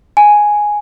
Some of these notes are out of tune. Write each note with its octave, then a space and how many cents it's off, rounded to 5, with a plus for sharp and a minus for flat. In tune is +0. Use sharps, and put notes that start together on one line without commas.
G#5 +5